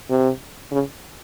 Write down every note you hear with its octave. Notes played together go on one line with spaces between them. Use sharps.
C3
C#3